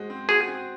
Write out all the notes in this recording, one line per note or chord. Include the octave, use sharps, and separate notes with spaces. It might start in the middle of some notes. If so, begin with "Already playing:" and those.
Already playing: G#3 F#4 C5
C4
F#4 G#4
C4